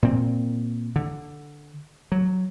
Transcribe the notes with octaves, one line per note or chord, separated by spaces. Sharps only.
A#2 C4
D3
F#3